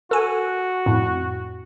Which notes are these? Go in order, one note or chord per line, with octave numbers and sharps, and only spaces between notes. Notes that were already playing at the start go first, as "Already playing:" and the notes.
F#4 A4 G#5
F2 A2